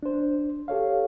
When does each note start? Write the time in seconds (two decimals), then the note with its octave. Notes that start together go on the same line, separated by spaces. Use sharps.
0.03 D4 C5
0.68 G4 A4 C#5 F5